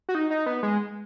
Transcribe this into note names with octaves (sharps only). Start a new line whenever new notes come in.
F#4
D#4
D#4
B3
G#3